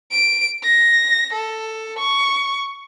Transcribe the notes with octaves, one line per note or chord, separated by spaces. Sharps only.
D7
A#6
A4
C#6